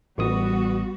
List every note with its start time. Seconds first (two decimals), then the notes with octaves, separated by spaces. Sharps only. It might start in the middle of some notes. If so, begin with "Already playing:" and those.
0.18 A1 G3 B3 F#4 D#6